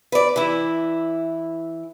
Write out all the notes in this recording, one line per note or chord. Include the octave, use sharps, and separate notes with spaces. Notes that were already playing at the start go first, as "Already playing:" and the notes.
B4 D5
E3 E4